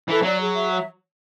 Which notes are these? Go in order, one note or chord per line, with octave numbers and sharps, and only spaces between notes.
E3 A4
F#3 D5
G#4
E5
C#5